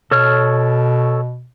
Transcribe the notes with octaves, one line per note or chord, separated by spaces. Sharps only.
B2 A4 C#5 F6